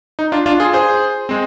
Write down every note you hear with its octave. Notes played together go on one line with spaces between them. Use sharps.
D#4
D4 F4
D4 F4
F4 G#4
G#4 C5
G#3 C4